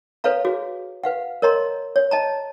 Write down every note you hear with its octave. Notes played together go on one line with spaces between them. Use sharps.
A4 B4 C#5 F5 A#5
F#4 G#4
B4 F5 F#5
A#4 C#5 D#5 A#5 C6
C#5
D#5 A5 A#5